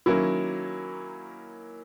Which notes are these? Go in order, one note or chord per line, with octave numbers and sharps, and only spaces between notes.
D#3 F#3 A#3 C#4 E4